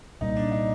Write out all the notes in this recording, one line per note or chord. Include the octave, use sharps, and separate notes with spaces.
C2 A#2 G3 D#4
D4
D#4